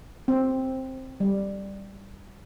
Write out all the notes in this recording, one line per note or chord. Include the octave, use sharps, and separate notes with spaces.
C4
G3